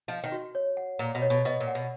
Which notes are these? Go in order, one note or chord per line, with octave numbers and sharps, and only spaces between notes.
F3 D#5
D#3
F#4
C#5
F#5
A#2 A#5
B2
C#5
B2
B2 D#5
A#2
F#5
B2